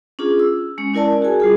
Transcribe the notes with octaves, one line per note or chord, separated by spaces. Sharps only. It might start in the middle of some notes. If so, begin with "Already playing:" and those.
C#4 D4 F4 G#4
E6
G#3 C#4
C#4 E4 A#4 D5 A5
F#4 G#4 G#5
G3 F4 G#4